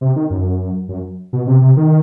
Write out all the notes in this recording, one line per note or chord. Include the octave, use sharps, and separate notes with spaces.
C3
D#3
F#2
F#2
B2
C3
C3
D#3